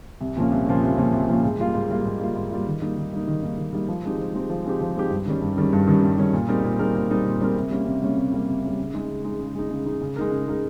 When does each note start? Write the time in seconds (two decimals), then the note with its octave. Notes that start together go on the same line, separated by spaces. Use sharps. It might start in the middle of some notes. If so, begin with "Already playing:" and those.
0.21 C2
0.37 A#2 F3 A#3 C#4
0.51 C2
0.67 A#2 F3 A#3 C#4
0.83 C2
0.97 A#2 F3 A#3 C#4
1.12 C2
1.29 A#2 F3 A#3 C#4
1.43 G#2
1.59 G3 A#3 F4
1.75 G#2
1.90 G3 A#3 F4
2.05 G#2
2.20 G3 A#3 F4
2.36 G#2
2.51 G3 A#3 F4
2.67 D#3
2.81 G3 A#3 D#4
2.97 D#3
3.13 G3 A#3 D#4
3.27 D#3
3.43 G3 A#3 D#4
3.58 D#3
3.73 G3 A#3 D#4
3.88 F3
4.04 G#3 C4 D#4 G4
4.19 F3
4.34 G#3 C4 D#4 G4
4.50 F3
4.65 G#3 C4 D#4 G4
4.81 F3
4.96 G#3 C4 D#4 G4
5.10 G2
5.26 D#3 G3 C#4
5.41 G2
5.57 D#3 G3 C#4
5.73 G2
5.87 D#3 G3 C#4
6.04 G2
6.18 D#3 G3 C#4
6.34 A#2
6.49 G3 C4 D#4 A#4
6.64 A#2
6.79 G3 C4 D#4 A#4
6.95 A#2
7.10 G3 C4 D#4 A#4
7.25 A#2
7.41 G3 C4 D#4 A#4
7.56 C3
7.71 G3 A#3 C#4
7.86 C3
8.02 G3 A#3 C#4
8.17 C3
8.32 G3 A#3 C#4
8.48 C3
8.64 G3 A#3 C#4
8.79 C#3
8.94 G#3 D#4
9.09 C#3
9.24 G#3 D#4
9.39 C#3
9.55 G#3 D#4
9.71 C#3
9.86 G#3 D#4
10.01 C#3
10.16 G#3 D#4 A#4
10.31 C#3
10.47 G#3 D#4 A#4